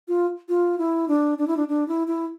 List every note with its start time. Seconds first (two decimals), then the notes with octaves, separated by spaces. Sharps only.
0.08 F4
0.49 F4
0.78 E4
1.08 D4
1.38 D4
1.47 E4
1.57 D4
1.68 D4
1.88 E4
2.07 E4